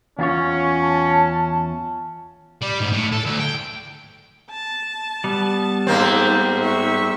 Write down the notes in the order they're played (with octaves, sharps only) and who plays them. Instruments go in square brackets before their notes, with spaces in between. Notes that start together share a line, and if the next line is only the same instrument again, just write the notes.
[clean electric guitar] E2 F4 C#5 [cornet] C#4
[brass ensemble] A5
[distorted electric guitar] G3
G#2
A2
A4
D2
G5
[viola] A5
[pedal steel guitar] G3 B3
[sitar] G#2 A#3 C4
[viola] E5 C#6